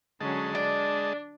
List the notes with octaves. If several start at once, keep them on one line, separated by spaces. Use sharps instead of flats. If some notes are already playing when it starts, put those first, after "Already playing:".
D3 F#3 G#3 C#4 D#5 A5
D4 D5